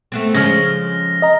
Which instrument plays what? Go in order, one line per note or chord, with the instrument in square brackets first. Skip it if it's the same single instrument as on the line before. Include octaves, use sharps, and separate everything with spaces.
[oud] A3 B3 C4
[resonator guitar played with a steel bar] C#3 [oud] F3 G#3 C#4 [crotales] F6 A#6
[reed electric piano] D#5 A#5